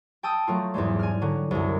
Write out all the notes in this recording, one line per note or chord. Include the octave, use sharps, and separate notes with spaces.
G5 A5 D#6 E6
F#3 A3 F4
E2 G#2 G3 G#3
G#5 F6
D3 F#3
C2 F#2